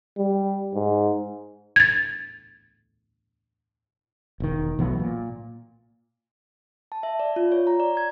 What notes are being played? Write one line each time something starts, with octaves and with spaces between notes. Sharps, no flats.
G3
G#2
G#6 A6
E1 D#3
B1 E3 F#3 B3
A#2
A5
E5
D5
F4
C#5
A#5
D5
G#6